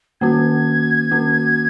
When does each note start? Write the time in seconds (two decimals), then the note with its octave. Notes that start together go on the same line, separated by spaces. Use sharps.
0.21 D#3 A#3 C#4 F#4 G#6
1.11 D#3 A#3 C#4 F#4